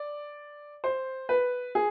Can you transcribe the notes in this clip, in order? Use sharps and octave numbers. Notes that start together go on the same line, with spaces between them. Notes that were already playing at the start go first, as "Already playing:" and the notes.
Already playing: D5
C5
B4
G#4